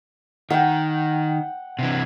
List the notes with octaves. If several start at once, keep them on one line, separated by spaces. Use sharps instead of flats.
D#3 F#5 G5
C3 E3